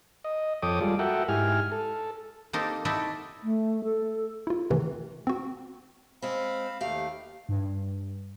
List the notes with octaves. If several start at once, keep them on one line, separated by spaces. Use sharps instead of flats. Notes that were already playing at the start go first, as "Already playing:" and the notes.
D#5
F2 A4 C#5 G5 D6 D#6
G3 G#3 F4 A4 D5
F#4 A4 A#4 E5 F#5 G5
G#2 E4 G4 G#5 F6
A4
A#3 C4 D#4 G4 A4 A#4
D#4 E4 F#4 A4 D5 E5
A3
A4
E4 F4
C3 D#3 E3 A3
C4 F#4
G#3 C4 F5 B5
D#2 A3 G4 F5
G2